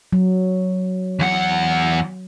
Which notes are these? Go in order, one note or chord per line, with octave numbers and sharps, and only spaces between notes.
F#3
E2 F#5